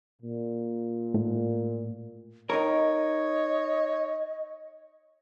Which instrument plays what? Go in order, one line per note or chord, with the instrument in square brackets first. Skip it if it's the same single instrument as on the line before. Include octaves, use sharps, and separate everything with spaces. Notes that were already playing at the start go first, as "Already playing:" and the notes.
[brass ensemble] A#2
[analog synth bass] A2
[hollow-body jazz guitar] D#4 A#4 [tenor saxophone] C#5 [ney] D#5